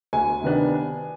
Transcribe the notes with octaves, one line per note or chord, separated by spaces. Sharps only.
D2 G#5
C3 D#3 B3 D4